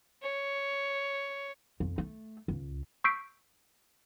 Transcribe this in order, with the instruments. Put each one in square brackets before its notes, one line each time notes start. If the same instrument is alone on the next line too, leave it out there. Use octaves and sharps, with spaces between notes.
[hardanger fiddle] C#5
[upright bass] F2
A3
C#2
[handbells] C#6 E6 G6 B6 C7 D7